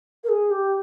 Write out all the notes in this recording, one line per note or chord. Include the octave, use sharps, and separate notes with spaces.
A#4
G#4
G4